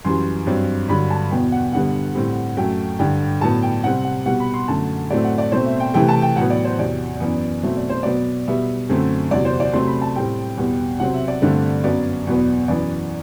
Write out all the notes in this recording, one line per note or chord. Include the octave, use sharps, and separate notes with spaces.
F#2 E3 G3 C6
G2 F#3 C4
G2 D3 F#3 B5
A5
E2 B2 F#3 B3 G5
F#5
G2 D3 G3 B3 F#5
A2 G3 C4
F#2 F#3 A3 G5
G2 D3 G3 G5
A2 F#3 B3 A5
G5
C3 G3 C4 F#5
F#5
B2 G3 B3 F#5
B5
C6
F#2 D3 A3 A5
A2 F#3 A3 C4 D5
F#5
D5
B2 A3 C4 C5
E5
G5
C3 E3 A3 G5
A5
G5
A2 F#3 B3 F#5
D5
C5
E2 C3 F#3 D5
F#2 E3 B3
B2 F#3 A3 C4 E5
D5
C5
B2 F#3 B3 D5
B2 G3 B3 E5
F#2 D3 A3 C4
E2 C3 F#3 D5
C5
D5
C3 F#3 A3 C4 C6
B5
A5
A2 G3 C4 G5
E2 B2 G3 B3
C3 F#3 C4 F#5
E5
D5
G2 D3 A3 C4
F#2 F#3 B3 D5
E2 B2 F#3 B3
F#2 E3 B3 D5